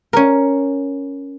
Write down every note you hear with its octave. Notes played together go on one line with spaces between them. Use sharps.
C#4 A#4